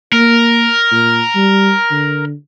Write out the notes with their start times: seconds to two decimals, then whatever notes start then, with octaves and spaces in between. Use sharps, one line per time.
0.13 A#3 A#4
0.92 A#2
1.36 G3
1.91 D3